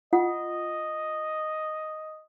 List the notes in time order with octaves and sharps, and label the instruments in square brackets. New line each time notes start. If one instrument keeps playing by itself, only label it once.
[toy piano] F4 F#5 D#6 [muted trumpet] D#5